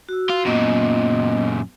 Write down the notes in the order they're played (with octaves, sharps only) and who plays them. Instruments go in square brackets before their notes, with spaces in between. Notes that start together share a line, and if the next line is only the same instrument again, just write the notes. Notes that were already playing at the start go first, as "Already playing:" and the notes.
[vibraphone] F#4 E6
[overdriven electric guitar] F4
[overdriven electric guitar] F#2 A#2 [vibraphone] B3 D#5